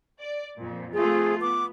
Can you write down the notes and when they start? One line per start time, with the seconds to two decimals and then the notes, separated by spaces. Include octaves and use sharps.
0.20 D5
0.56 F2 A#2
0.94 A3 C4 F4 G#4
1.41 B3 D6